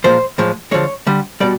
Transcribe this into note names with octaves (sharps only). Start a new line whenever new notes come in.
A#2 F3 G#3 C5
A2 F3 G#3
D3 F3 G#3 C#5
D3 G3
B2 G3 D5